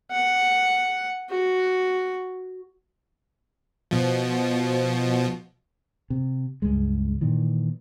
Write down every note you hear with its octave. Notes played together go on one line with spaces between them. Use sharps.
F#5
F#4
B2 F3
C3
C#2 G2 G#3
A#2 D#3 E3